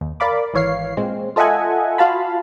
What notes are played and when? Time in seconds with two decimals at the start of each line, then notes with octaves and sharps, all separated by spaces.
0.01 D#2
0.20 A#4 D5 F5 B5 D6
0.54 G#1 E3 C#5 F5 C7
0.97 A#2 G#3 C4
1.36 F4 A4 D#5 E5 F#5 G#5
1.98 F4 F#4 F5 A5 B5